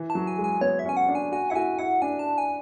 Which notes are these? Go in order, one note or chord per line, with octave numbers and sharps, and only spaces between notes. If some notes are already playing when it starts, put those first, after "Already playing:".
Already playing: E3
A5
F#3
G#5
G#3
G#5
B3 C#5
E5
C#4 G#5
F#5
D4
G#5
F#4 G#5
E4 F#5
F#4 G#5
E4 F#5
D4 G#5
A5
G#5